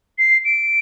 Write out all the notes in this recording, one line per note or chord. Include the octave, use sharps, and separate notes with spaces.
C7
D7